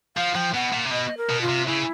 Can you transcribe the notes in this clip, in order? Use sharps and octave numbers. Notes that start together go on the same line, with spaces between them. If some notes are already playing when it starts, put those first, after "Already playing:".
F3 F5
F3 G5
B2 F#5
A#2
C3
B2 D#5
A#4
B2
F4
C3
C#3 E4